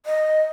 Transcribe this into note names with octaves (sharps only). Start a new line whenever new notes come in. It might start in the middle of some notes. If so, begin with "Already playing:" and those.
D#5